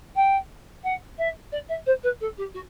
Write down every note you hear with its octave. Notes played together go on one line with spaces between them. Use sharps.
G5
F#5
E5
D5
E5
C5
B4
A4
G4
F#4